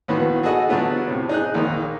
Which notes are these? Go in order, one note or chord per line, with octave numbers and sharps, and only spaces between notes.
A#1 A2 D#3 B3 F#4 B4
F#4 G#4 A4 D#5 F#5
D3 F#3 A3 B3 F4
A2 C3
D#4 G#4 F#6
A#1 D#3 A#3